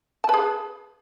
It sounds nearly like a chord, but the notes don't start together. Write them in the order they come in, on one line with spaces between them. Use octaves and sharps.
A5 B4 G#4